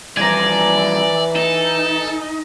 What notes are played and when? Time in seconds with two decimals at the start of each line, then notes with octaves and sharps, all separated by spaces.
0.17 G2 E3 F3 D5 G#5 A#5
1.36 D#4 A4